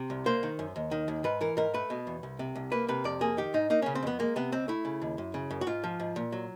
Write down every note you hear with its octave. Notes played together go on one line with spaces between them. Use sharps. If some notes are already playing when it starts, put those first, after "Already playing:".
Already playing: C3
C2
A#3 C5
D#3
F#2
D#2
D#3
D#2
G#2 B4
E3 A#4
G#2 A#4
A3 B4
B2
E2
C2
C3
C2
A#3 B4
C3 B4
F2 D5
A#3 G#4
D#3 G4
G#2 D#4
A#3 D#4
C#3 C#4
C4
F2 B3
G#3 A#3
C3 B3
C#2 C4
A3 E4
C#3
D#2
F#2
C#3
F#2
F#4
G#2 F4
F3
G#2
A#2
F#3